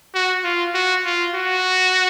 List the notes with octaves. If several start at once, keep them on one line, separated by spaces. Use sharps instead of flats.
F#4
F4
F#4
F4
F#4